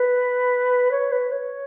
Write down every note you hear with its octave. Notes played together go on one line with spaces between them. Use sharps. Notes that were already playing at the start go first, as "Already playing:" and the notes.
Already playing: B4
C#5
B4
C#5